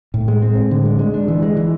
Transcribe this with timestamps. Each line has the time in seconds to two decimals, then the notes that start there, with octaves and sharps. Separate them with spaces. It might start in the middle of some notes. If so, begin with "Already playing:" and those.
0.14 A2
0.28 G#3
0.42 C4
0.57 A2
0.71 D3
0.85 G#3
0.99 G#3
1.14 D4
1.28 E3
1.43 G#3
1.57 E3